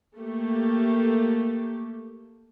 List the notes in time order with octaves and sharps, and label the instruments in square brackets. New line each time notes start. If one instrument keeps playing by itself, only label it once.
[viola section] A3 A#3 G4